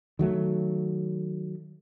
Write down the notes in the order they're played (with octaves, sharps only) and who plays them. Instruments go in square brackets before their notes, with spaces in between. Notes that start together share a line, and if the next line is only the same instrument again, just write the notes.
[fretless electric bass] D#3 F#3 A3